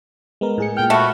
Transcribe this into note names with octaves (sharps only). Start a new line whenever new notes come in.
G#3 B3 A#4
A2 G#4 C#7
A#2 G5 F6
A3 B3 F#4